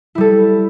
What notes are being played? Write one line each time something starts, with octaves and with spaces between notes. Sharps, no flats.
G3 E4 A4